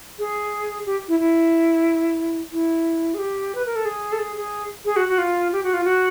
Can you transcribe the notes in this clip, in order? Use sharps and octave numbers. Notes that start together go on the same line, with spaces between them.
G#4
G4
E4
E4
E4
G#4
G4
B4
A#4
A4
G#4
A4
G#4
G#4
G#4
F#4
F#4
F4
G4
F#4
F4
F#4